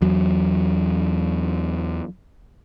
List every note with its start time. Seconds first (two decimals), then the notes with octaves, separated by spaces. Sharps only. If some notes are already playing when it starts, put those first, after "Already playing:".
0.02 E2 F#3